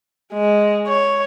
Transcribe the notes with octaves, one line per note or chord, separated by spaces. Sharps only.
G#3
C#5